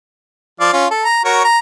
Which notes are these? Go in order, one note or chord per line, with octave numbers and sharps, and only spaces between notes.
F3 D5 F5
C#4 F4
A4
A#5
F#4 A#4 C#5
A#5